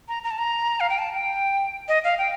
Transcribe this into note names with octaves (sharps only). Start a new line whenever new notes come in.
A#5
A#5
A5
A#5
F5
G5
A5
G5
D#5
F5
G5